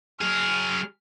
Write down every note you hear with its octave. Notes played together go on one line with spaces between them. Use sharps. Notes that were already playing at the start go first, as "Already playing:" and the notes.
F#3 G#4 F6